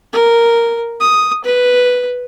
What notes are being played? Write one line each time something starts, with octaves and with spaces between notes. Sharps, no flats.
A#4
D#6
B4